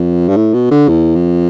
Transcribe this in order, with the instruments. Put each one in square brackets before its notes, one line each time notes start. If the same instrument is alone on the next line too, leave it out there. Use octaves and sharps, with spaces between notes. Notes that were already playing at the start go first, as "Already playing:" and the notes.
Already playing: [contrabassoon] F2
G2
A2
B2
D3
E2
F2